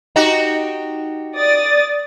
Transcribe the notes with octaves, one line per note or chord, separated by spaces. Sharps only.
D#4 F#4 G4
D5 D#6 A6